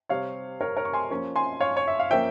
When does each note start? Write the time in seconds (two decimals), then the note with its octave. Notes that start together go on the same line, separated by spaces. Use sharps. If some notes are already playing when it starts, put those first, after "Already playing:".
0.09 C3 G3 C4 C#5 F5
0.61 A#4 C#5
0.77 A#4 C#5
0.85 C#6
0.93 G#5 C6
1.10 F3 A#3 C#4
1.36 G#5 C6
1.60 C#5 F5
1.77 C#5
1.88 E5
2.00 F5
2.11 F3 A#3 C#4 E5 G5